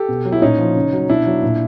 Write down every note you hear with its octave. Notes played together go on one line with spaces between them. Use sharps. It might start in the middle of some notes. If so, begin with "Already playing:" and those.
Already playing: G4 A4
B2
F#3
E4
A#2 C#4 D#4
F3
C#3
F#3
B2 D4 E4
F#3
A#2